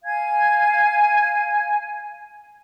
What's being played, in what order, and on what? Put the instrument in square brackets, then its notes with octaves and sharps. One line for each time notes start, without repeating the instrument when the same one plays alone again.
[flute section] F5 G#5 G#6